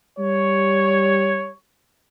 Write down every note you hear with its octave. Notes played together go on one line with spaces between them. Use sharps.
G3 G4 C#5